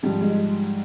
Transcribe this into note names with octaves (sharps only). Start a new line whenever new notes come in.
G#2 F3 G3
G#3